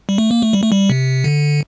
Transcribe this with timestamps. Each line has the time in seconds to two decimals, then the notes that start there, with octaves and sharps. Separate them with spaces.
0.09 G3
0.18 A3
0.31 A#3
0.42 A3
0.53 G3
0.63 A3
0.72 G3
0.90 C3
1.24 D3